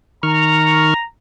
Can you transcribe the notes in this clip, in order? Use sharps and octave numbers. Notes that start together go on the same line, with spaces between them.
D#3 A#5 C#6 F6